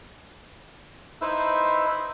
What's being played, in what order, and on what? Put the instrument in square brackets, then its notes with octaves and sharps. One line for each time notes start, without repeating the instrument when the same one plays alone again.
[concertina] D#4 E4 B4 C5 E5 E6